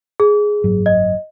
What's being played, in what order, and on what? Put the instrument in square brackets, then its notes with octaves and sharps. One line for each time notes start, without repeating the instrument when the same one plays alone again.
[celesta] G#4
[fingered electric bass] F#1 G#2 F#3
[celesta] D#5